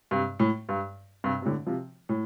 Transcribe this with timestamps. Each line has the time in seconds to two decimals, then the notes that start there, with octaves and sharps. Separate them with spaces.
0.11 G2 C3
0.40 A2
0.69 G2
1.24 G2 C3
1.42 C3
1.45 A2 D3
1.66 C3 F3
2.09 A2